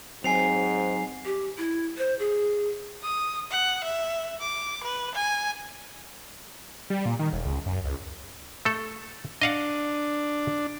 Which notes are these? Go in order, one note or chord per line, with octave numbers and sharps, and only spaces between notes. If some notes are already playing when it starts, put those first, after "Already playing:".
G#2 F#3 C4 G#5 C7 F7
G4
E4
C5
G#4
D#6
F#5
E5
D6
B4
G#5
G3
A#2
D#3
E1
C#2
F#2
C#2
A3 A4
D4 D#5 F5 F#5